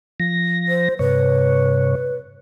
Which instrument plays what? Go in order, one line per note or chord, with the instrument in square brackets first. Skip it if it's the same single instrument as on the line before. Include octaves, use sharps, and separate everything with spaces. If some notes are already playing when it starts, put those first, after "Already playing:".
[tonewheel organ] F3 A#6
[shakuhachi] C5
[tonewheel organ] G2 C3 C#5 [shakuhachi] B4